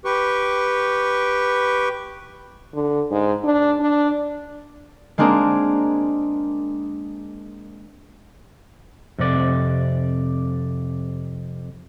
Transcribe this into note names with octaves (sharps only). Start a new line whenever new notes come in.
G4 B4 C#6
D3
G#2
D4
D4
G#3 A#3 C4 D4 G#4 A#4
F2 C3 D5